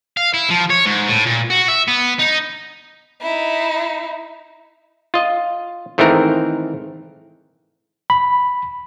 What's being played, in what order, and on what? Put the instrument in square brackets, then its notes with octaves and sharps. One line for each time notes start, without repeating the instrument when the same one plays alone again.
[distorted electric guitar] F5
E4
F3
C#5
G#2
A2
A#2
F#4
E5
B3
D#4
[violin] D#4 E4
[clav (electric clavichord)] F4 D#5
G#2 D#3 E3 A3 C4 A#4
[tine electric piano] B5